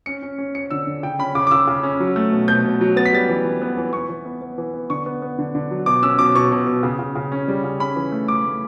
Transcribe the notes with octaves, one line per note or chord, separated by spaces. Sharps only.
C#4 C#7
C#4
C#4
C#4 C#7
D3 E6
D3
C#3 G5
C#4 B5
C#3 D6
D6
C#3 E6
C#3
C#4
F#3
A3
B2
B2 G6
B2
F#3
B3 A6
B6
G3 A6
E3
E3
B3
E3
B3 C#6
E3
B3
B3
E3
B3
D3 C#6
B3
B3
D3
D3
F#3
B2 D6
C#4 E6
B2 D6
B2 C#6
B2
B2
C#3
C#3
C#3
C#4
G3
C#3
C#4 B5
E3
A3
A3 D6
A3